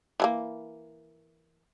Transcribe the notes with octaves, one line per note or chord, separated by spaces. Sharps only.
E3 G#3 A#3